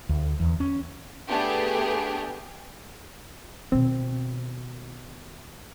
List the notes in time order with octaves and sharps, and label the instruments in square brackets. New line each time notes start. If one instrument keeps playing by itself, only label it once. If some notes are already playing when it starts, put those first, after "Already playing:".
[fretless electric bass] D2
E2
C#4
[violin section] A3 B3 D4 G4 G#4
[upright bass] B2 D#3 [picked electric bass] C4